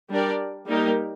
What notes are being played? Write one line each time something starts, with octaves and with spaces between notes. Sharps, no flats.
G3 D4 G4 A#4 D5
G3 A#3 D#4 G4 A#4